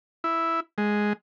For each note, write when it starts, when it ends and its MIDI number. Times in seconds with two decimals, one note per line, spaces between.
0.24 0.60 64
0.78 1.13 56